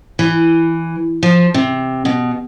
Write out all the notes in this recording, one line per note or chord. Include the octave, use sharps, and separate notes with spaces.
E3
F3
C3
B2